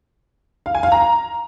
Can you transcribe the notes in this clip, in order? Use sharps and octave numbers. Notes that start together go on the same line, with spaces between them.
F5
G#5
F5
A#5